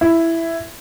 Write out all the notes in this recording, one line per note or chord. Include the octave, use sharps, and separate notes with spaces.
E4